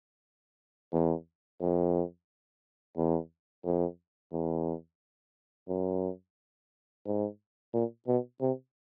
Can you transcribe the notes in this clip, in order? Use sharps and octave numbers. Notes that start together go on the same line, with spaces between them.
E2
F2
E2
F2
E2
F#2
G#2
A#2
B2
C3